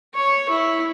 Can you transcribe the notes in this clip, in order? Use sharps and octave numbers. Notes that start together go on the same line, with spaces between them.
C#5
E4